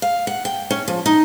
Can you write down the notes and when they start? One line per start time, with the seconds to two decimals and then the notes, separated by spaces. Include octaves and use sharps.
0.02 F5
0.27 F#5
0.45 G5
0.71 C#4
0.88 F3
1.06 D#4